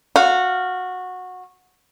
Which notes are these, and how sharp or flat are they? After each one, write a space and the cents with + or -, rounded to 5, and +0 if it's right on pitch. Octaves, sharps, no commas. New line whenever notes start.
F#4 -15 F5 +0